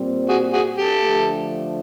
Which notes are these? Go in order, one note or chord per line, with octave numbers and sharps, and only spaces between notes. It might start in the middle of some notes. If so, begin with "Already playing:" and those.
Already playing: A#2 G3 C4
F#4 G#4
F#4 G#4
G4 A4
D3 F3 A3